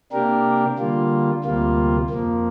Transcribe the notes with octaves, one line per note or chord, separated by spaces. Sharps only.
C3 A#3 D4 G4 A#4
D3 G3 A#3 F4
D2 C3 G3 A#3 F4
F2 F3 A#3